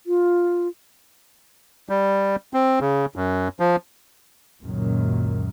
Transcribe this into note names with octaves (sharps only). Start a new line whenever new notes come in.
F4
G3
C4
C#3
F#2
F3
C#2 F#2 A#2 D#3